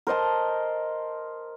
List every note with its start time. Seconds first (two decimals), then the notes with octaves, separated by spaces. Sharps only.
0.07 A#4 C5 D#5 A5